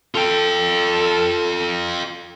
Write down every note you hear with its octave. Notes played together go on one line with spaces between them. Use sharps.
F4 A4 G5